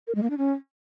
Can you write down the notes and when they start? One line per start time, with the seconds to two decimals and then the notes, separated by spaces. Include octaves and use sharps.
0.07 A#4
0.15 G#3
0.23 A#3
0.30 D4
0.38 C#4